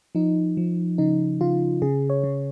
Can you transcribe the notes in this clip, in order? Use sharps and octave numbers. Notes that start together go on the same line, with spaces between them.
F3 D#4
F3
C#3 D#4
C#3 F4
C#3 G#4
C#5
C#3